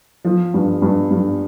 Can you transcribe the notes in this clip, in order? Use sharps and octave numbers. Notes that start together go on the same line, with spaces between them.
F3
G2
G2
G2